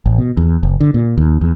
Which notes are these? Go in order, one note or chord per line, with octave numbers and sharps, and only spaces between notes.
A1
B2
E2
F#1
D3
A#2
D#2
E2